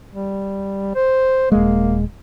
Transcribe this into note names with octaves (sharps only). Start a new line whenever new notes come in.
G3
C5
D#1 G#3 A#3